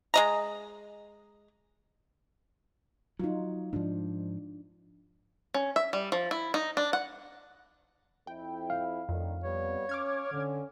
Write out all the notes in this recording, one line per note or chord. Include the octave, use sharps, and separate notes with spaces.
G#3 D#5 A#5
F#3 D#4 F4
G#2 F3 D4
C#4
E5
G3
F3
E4
D#4
D4
F#5
F2 E4 G5
F5
F2 A2 D3 D#3
G3 B3 C#5
C#4 D6 F6 G#6
D3 C#4